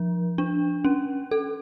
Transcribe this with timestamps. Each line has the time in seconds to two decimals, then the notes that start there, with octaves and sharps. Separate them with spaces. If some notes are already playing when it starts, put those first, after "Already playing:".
Already playing: F3
0.38 D4
0.85 C#4
1.31 A4